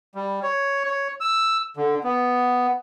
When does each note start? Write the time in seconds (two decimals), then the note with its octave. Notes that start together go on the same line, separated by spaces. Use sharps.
0.15 G3
0.43 C#5
0.85 C#5
1.21 E6
1.77 D3
2.04 B3